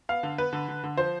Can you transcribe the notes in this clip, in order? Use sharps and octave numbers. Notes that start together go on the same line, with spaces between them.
B3 F5
D3
B3 B4
D3
D3
D3
F3 C5